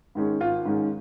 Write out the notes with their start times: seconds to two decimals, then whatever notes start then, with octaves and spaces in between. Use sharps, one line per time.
0.15 G#2 D#3 G#3 C#4
0.41 G#1 F4
0.65 G#2 D#3 G#3 C#4